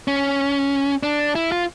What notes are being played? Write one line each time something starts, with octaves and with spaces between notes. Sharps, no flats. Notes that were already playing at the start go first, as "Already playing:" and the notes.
C#4
D4
E4
F4